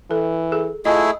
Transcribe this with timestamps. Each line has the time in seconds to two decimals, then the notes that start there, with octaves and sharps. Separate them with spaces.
0.11 E3 A4
0.52 G#4 A4
0.85 A3 E4 F4 G#4 D#5 G#5